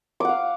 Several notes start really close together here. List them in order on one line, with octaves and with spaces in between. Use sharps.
D6 F#5 F5